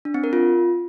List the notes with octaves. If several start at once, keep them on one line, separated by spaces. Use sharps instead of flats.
D4
C4
A#4
F4